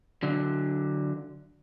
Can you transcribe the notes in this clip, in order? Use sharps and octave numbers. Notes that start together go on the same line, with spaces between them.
D3 F#3